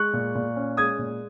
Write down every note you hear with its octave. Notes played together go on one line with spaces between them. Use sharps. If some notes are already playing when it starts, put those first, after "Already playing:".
Already playing: G#3 C#6 F#6
A#2
A#2
C#4
G#3 D#6 G#6
A#2